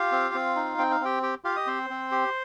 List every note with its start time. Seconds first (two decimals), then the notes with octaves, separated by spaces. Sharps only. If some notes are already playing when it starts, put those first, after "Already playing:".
Already playing: F4 G4 F5
0.12 C4
0.34 C4
0.56 D#4
0.78 C4 G5
0.91 F5
1.00 C4 G4 G5
1.23 G4 G5
1.44 F4 G4 F5
1.56 D#5 D#6
1.67 C4 C5 C6
1.90 C4
2.12 G4